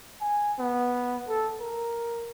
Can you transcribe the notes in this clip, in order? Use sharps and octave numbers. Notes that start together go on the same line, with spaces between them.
G#5
B3
A4
A#4